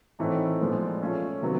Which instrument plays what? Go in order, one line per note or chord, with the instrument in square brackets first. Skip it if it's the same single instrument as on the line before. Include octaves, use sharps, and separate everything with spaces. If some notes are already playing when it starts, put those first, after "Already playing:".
[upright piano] A2 E3 A3 C4 D#4
A#2 F3 G#3 B3
A3 C#4 F4
C3 D#3 F#3 B3